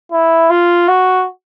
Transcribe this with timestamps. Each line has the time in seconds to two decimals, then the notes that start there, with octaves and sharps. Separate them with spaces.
0.12 E4
0.50 F4
0.88 F#4